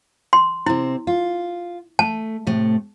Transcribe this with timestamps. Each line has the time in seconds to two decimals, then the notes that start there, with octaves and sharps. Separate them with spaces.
0.33 C6
0.66 C3 C4 E4
1.07 F4
1.99 A3 A5
2.47 A2 C3 A3